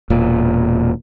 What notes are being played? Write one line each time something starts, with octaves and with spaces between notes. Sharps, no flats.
E1 A#2